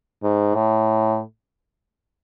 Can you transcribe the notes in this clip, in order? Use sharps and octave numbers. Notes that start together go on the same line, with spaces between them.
G#2
A2